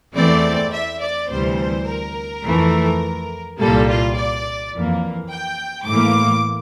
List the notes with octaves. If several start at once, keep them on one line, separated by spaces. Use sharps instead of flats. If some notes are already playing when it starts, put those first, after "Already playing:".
E2 E3 A3 C4 D5
E5
D5
D2 C3 E3 G3 C5
A#4
F2 E3 A3
C2 A#2 G3 A#3 A4
F4
D5
F2 E3 A#3
G5
A2 E3 A#3 D6